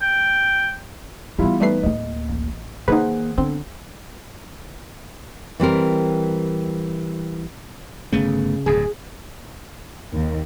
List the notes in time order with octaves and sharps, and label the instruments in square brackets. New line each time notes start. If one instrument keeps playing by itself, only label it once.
[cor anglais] G5
[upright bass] E3 B3 [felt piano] G3 E4 F4
[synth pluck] G3 A3 C7 [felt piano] D#4 B4
[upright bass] D1 A#3 [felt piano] D#5
[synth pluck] A1
[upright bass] D#3 A#3 [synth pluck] D#4 B4 [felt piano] G#4 C5 F#5
[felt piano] D3 [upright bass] B3 [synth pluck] C4
[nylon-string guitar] E3 G3 C4 A#4
[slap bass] G1 A3 B3 [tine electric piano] C#3
[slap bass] D1 G2 [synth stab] G#4
[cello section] D#2